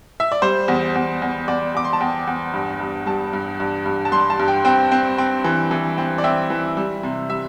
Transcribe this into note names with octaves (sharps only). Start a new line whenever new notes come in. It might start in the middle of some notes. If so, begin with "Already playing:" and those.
E5
D5
G3 C5
E2
E2
E2
E2 D5
E2 D6
C6
A5
E2 G5
E2
G2
G2
G3 A5
G2
G2
G2
A5
G3 C6
A5
G2
G5
C4 G5
C4
C4
E3
E3
C4
D5
C4 E5
E3
G3
C3
G3 E5